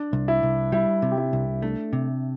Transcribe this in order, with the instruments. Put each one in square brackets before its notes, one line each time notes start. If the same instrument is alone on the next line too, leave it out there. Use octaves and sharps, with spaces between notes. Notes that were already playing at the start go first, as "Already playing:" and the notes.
Already playing: [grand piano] D4
[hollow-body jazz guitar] C2
[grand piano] E4
[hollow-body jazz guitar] C2
[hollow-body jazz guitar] G3 [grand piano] E4
[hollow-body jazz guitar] C3
[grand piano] G4
E4
[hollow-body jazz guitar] C2
[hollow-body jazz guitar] A3 [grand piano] D4
[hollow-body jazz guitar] C3